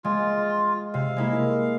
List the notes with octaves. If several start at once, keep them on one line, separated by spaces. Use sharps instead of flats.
G#3 F4
C3 F5
G#3 A#3 E4